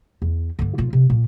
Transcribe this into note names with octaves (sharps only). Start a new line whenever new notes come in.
E2
G2 D3
B1 F4
C3
A#2